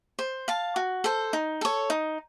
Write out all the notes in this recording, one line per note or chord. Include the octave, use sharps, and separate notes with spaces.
C5
F5 A5
F#4
A4 C5
D#4
A4 C#5
D#4